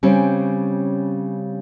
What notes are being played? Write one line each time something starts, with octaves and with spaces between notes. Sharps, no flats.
C#3 G3 C4 C#4